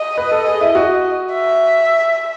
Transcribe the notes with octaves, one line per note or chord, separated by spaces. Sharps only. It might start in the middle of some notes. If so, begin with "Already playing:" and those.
Already playing: D#5
B4
A4
G#4
E4
F#4
E5